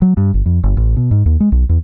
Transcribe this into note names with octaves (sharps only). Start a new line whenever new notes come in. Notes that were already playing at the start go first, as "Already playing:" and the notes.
F#3
G2
G1
F2
G1
A1
B2
G#2
D#2
G#3
B1
E2